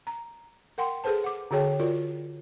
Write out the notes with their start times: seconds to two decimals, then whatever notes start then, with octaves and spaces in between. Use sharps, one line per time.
0.07 A#5
0.78 A#4 F#5 G5 C6
1.04 G#4 A4 B4 C5 A5
1.24 F#5 D6
1.51 D3 F#4 G#4 C#5 G5 A5
1.80 F4 F#4 A#4 D5